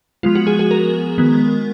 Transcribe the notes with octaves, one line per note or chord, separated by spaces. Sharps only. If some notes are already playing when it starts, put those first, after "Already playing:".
F3 G#3 B3 F4
F#4
G#4
G#4
A#4
D#3 G#3 B3